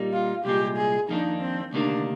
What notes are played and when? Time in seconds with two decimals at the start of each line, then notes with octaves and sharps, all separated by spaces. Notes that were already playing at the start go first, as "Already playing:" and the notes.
Already playing: A#2 G3 A#3 D#4
0.13 F4
0.45 C2 A#2 G#3 G4
0.77 G#4
1.09 F2 D#3 A#3 D4 D#4
1.41 C4
1.73 D2 C3 D#3 G3 A#3 D4